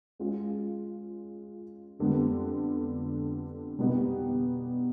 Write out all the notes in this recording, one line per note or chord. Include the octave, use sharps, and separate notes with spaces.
G#3 C#4 F4
F2 D3 G3 B3
B2 G3 B3 D#4 G4